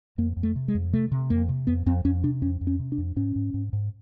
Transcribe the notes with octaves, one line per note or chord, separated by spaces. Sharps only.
F2 A#3
F2
A3
C3
G#3
F2
C3 A3
C3
F2 A#3
C3
F2 B3
F2 C4
F2 C#4
C3 D4
F2 C#4
F2
C#4
C3
D4
F2
G#2 C#4
G#2
G#2
G#2